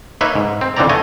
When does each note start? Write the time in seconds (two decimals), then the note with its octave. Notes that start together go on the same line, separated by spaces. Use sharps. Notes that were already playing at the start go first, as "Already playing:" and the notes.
0.21 A#3 D#4 B4 C#5 D#5 E5
0.35 G#2
0.61 C4
0.76 F2 D3 E3 C4 D5 A#5
0.89 A3 C#5 D#5 G#5